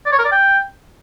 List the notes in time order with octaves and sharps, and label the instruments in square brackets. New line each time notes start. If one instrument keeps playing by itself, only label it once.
[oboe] D5
C#5
A#4
D5
G5